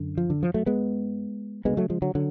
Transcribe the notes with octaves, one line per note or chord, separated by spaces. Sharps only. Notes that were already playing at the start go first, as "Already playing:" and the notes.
Already playing: F#2 D3
F3
D3
F3
F#3 A3
G#3 B3
D2 C#3 G#3 B3
F#3 A3
F3 G#3
D3 F#3
D3 F#3